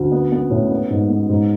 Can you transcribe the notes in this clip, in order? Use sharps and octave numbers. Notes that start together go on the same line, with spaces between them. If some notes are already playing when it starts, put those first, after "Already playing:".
Already playing: D2
B3
B3
A2
B3
G#2
B3
G#2